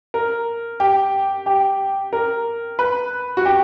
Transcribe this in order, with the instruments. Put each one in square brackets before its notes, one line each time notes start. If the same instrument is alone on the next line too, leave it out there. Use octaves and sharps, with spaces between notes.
[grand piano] A#4
G4
G4
A#4
B4
F#4
G4